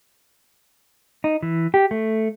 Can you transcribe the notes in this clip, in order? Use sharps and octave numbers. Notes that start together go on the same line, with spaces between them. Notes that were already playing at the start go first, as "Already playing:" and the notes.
D#4
E3
G4
A3